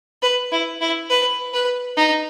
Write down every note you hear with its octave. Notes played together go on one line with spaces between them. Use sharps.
B4
E4
E4
B4
B4
D#4